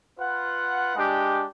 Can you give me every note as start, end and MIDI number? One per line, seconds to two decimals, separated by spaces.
0.19 0.95 65
0.19 0.95 71
0.19 0.95 78
0.96 1.44 56
0.96 1.44 62
0.96 1.44 67